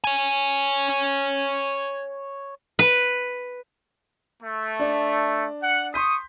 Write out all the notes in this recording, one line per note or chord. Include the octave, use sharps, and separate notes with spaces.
C#5 G#5
B4
A3
D4 D5
F#5
C6 C#6 D#6 G6 B6